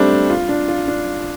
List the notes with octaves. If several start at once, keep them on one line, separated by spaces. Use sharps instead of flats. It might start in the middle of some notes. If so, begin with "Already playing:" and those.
Already playing: G3 A3 C4 D4
F4
D4
F4
D4